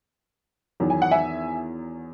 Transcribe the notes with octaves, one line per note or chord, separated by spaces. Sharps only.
E2 D#3 F#3
G#5
F#5
E5 G#5